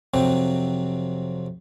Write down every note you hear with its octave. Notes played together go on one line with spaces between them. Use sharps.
F2 C3 F#3 C4